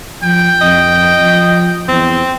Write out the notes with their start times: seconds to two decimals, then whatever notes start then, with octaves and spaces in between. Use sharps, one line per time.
0.23 F3 G5
0.61 F2 D#5
1.22 F3
1.88 E2 C4